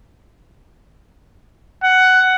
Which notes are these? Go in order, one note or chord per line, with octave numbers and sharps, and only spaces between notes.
F#5